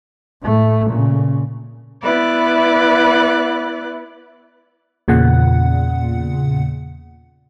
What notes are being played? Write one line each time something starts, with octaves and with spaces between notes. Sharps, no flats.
A2 A3
A#2 C#3
B3 E4 B4 D5 F#6
E2 A#2 C#3 F#5